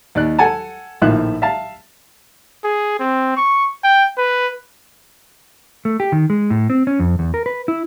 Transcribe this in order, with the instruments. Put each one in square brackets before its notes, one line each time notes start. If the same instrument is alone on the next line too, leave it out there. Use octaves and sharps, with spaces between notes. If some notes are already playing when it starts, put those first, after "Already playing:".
[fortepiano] D#2 D5 F#6
A4 F#5 G#5 A5
A#1 A2 D#3 F4 E5 F#6
E5 F5 A5
[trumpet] G#4
C4
C#6
G5
B4
[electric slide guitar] A3
G4
D#3
G#3
A2
C4
C#4
F2
E2
A#4
B4
E4